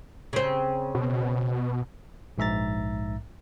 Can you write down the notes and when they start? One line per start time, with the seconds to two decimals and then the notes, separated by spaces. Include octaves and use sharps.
0.33 C#3 C4
0.95 B2
2.38 A#1 G#2 E5 A#5 A6